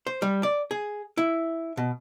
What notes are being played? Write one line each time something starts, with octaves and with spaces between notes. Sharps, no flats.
C5
G3
D5
G#4
E4
B2